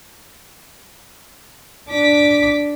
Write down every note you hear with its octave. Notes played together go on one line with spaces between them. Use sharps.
D4 D6 B6